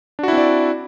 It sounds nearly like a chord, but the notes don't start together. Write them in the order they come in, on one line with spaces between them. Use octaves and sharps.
D4 F#4 E4 C4 D5